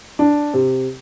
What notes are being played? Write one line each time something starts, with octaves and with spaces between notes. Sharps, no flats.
D4
C3